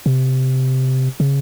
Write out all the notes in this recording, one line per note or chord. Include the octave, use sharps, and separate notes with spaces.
C3
C#3